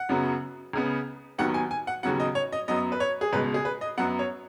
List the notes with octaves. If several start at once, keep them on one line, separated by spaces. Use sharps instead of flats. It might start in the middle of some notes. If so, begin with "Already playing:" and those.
Already playing: F#5
F#2 C#3 F#3 B3
C#2 C#3 B3
D#2 D#3 F#3 B3 F#5
G#5
G#5
F#5
D#2 C#3 F#3 B3 F#5
D#5
C#5
D#5
F#2 F#3 B3 D#5
B4
C#5
G#4
C#2 B2 G#3 B4
G#4
B4
D#5
F#2 F#3 B3 F#5
C#5